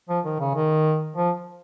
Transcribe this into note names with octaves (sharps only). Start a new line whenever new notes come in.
F3
D#3
C#3
D#3
F3